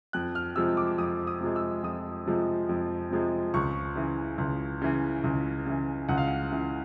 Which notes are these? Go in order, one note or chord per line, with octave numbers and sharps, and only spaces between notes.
F2 F#6
F6
C3 F3 G#3 E6
D6
F2 D#6
D#6
C3 F3 G#3
E6
F2 D#6
C3 F3 G#3
F2
C3 F3 G#3
C#2 C#6
C#3 E3
C#2
C#3 E3
C#2
C#3 E3
C#2 F#5
F5
F#5
C#3 E3